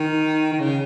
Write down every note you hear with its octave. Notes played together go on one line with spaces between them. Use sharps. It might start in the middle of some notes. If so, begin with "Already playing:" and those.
Already playing: D#3
D#3
C#3